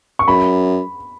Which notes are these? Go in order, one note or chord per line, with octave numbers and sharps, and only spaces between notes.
C#6
F#2 B5